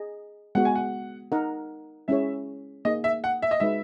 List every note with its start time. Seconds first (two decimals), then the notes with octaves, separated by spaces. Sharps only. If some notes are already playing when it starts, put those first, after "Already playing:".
Already playing: G#4 D#5
0.55 G#3 B3 F#4 F#5
0.65 G#5
0.75 F#5
1.32 D#4 A#4 D#5 F#5
2.08 G#3 C#4 E4 G#4 C#5 E5
2.85 A#3 D#4 G#4 D#5
3.04 E5
3.24 F#5
3.42 E5
3.51 D#5
3.60 G#3 D#4 F#4 B4 E5